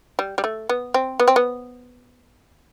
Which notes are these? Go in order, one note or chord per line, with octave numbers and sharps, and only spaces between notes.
G3
G3
A3
B3
C4
B3
C4
B3